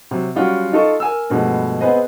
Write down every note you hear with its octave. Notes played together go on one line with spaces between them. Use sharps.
C3 F#3
F#3 G3 C#4 F4 F#4
D#4 F4 A4 D#5 C#6
A#4 G#5 E6
G2 B2 F3 G#3 A3
B3 C4 G#4 B4 C5 D#5